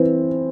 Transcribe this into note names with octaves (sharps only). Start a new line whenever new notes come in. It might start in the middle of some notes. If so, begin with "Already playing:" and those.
Already playing: E3 C4